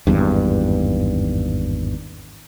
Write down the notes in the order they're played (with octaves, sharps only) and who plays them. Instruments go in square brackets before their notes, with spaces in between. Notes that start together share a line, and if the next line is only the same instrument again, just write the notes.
[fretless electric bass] G#1 E2 G2